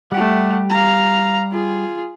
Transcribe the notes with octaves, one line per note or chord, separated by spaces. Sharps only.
G3 A3 G4 F#5
F5 A#5
F4 G#4